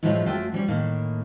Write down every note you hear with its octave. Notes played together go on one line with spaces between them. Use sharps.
A2 F3 F#3 G#3 E4 F4
F#2 A3 F4 F#4 G5
F3 G3 C#4
A2 D#3 A#3